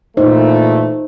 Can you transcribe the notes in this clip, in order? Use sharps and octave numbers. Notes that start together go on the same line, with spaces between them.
A#2 E3 A3 D#4 C5